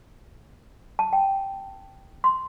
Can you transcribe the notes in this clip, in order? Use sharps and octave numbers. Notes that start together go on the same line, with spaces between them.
A5
G5
C6